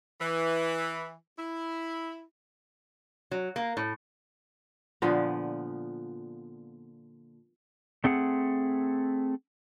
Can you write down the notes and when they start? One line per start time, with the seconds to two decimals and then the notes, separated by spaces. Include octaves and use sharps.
0.20 E3
1.38 E4
3.31 F#3
3.56 A#3
3.77 A2
5.02 A#2 D3 F3 B3
8.04 A3 C4 G#4 F#5